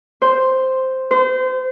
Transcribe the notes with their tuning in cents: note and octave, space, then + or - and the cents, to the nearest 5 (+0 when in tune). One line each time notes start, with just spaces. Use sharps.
C5 +0
C5 -30